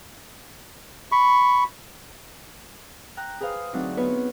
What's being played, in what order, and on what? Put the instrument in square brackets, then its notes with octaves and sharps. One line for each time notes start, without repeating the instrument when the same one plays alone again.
[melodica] B5 C#6
[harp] G5 A#5 F#6
G#4 B4 C5 F5
D2 F#3 C4 D#4 D5 F#5
B3 F4 F#4 B4 C#5